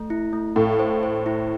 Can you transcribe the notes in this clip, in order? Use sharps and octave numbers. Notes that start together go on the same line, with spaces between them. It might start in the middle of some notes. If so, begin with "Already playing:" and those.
Already playing: A3
E4
A3
A2 F5
C5
C5
E4